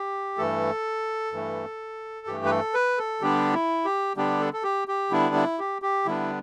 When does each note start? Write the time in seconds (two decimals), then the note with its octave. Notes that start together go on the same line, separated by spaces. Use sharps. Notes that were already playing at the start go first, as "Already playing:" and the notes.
Already playing: G4
0.38 G2 E3 A3 A4
1.32 G2 E3 A3
2.27 G2 E3 A3 G4
2.45 B4
2.50 A4
2.74 B4
2.98 A4
3.21 D3 G3 B3 D4 G4
3.53 E4
3.85 G4
4.16 D3 G3 B3 D4 G4
4.40 A4
4.53 A4
4.63 G4
4.88 G4
5.11 D3 G3 B3 D4 E4
5.35 E4
5.59 G4
5.82 G4
6.06 D3 G3 B3 D4 E4